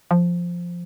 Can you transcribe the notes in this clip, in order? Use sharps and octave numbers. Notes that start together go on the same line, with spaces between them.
F3